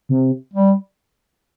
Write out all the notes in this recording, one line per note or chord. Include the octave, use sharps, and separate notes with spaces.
C3
G3